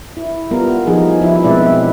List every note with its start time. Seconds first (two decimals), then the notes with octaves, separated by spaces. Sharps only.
0.17 E4
0.51 G3 B3 F4 A#4
0.86 F3 G3 D#4 G#4
1.21 F3 E4
1.43 B2 G#3 C4 B4 D5 E5
1.62 E4